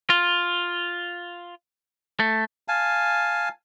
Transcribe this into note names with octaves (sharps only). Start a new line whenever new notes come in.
F4
A3
F5 G#5 A5